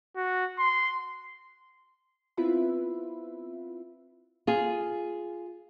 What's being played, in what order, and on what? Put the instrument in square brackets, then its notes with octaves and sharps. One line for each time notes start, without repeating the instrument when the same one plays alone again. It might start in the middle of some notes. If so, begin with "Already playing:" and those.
[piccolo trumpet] F#4
C6
[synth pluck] B3 C4 E4 F4 B4 E5
[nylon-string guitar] F4 G#4